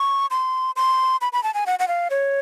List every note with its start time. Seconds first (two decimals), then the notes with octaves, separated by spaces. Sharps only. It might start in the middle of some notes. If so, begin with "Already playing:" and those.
Already playing: C#6
0.31 C6
0.76 C6
1.21 B5
1.33 B5
1.43 A5
1.54 G#5
1.66 F#5
1.79 F#5
1.88 F5
2.10 C#5